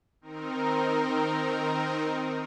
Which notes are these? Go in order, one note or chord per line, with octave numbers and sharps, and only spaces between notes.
D#3 C4 D#4 A#4